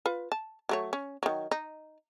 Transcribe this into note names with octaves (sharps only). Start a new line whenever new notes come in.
F4 B4
A5
F#3 A3 C#5
C#4
D#3 F#3
D#4